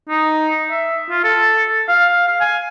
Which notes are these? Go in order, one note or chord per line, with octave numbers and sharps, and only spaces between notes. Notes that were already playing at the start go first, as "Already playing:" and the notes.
D#4
E5
F4
A4
F5
F5
G#5